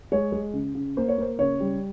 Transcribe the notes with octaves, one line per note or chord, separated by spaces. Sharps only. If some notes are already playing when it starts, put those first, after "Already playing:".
G#3 C#5
G#3
C#3
C#3
A#3 C5
C#5
A#3 C5
C#3 C#5
G3